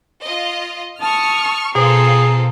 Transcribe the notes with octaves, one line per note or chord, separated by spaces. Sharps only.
F4 D#5
A5 C#6 D#6 F6
B2 C4 F4 G#4 A4 A#5 C7